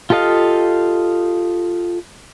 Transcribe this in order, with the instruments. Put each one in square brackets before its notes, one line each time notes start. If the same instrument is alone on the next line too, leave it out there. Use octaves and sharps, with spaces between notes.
[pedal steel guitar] F4 G4 A4 D#5 F5